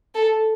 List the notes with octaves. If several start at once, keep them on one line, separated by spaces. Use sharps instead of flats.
A4